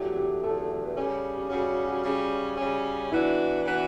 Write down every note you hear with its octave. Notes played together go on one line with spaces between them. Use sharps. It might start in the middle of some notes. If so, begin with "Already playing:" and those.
Already playing: E2 D3 F#3 A3 G4
G4
E2 D3 F#3 A3 A4
A4
A4
B4
C#3 G3 C#4 A4
G4
C#3 G3 C#4 F#4
F#4
F#4
C#3 G3 C#4
C#3 G3 C#4
E3 B3 D4 E4 F#4
E3 B3 D4 F#4